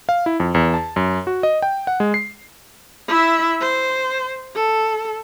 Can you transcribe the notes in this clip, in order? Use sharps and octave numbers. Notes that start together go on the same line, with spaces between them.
F5
E4
F2
E2
A5
F#2
F#4
D#5
G5
F#5
G#3
C7
E4 E5
C5
A4